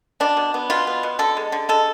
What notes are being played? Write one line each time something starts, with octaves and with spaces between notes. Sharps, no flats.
B2 D4
B2
B3
B2 F4
B3
B2
D3 A4
G#3
D3
G#3 A4